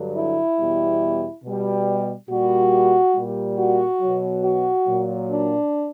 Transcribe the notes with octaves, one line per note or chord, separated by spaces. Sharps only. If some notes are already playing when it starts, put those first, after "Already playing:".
Already playing: G2 D3 F#3
E4
E2 B2 G3
B2 G3
A#2 G3 F#4
A#2 G3
F#4
B2 F#3
F#4
A#2 F#3
D4